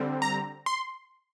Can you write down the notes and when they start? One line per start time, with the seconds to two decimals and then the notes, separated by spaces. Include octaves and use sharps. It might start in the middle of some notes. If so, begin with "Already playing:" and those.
Already playing: D3 G3 C4
0.22 A#5
0.66 C6